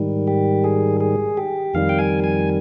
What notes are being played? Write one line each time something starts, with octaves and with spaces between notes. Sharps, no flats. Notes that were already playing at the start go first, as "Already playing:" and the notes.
Already playing: G#2 D#3 G3
G4
G#4
G#4
G4
F2 D#3 G3 F5
G5
G#5
G#5